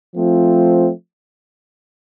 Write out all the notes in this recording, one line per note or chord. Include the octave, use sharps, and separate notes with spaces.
F3 A3 C4 F4